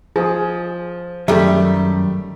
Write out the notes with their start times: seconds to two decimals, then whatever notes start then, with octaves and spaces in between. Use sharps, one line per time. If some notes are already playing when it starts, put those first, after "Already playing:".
0.16 F3 G#4
1.28 F#2 D#3 G3 A3 G4 E5